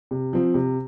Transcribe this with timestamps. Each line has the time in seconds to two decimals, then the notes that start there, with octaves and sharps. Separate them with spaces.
0.11 C3
0.33 F3 C4 F4
0.54 C3